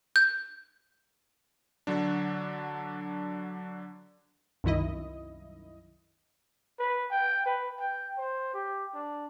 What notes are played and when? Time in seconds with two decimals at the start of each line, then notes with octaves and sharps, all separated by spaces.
0.16 G6
1.87 D3 F#3 D4
4.64 C2 F#2 D#3 E4 D#5
6.79 B4
7.11 G5
7.46 B4
7.79 G5
8.18 C5
8.54 G4
8.94 D4